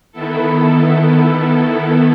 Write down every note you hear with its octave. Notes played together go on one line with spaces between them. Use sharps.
D#3 B3 E4 A4